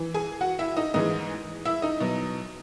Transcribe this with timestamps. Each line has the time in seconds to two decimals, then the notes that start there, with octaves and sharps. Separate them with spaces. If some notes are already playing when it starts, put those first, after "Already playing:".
Already playing: E3
0.14 G#4 G#5
0.41 F#4 F#5
0.59 E4 E5
0.77 D#4 D#5
0.94 G#2 E3 G#3 D#4 D#5
1.65 E4 E5
1.82 D#4 D#5
2.00 B2 F#3